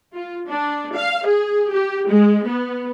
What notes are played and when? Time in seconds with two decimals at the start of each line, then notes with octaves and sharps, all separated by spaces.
0.15 F4
0.49 D4
0.96 F5
1.26 G#4
1.72 G4
2.08 G#3
2.47 B3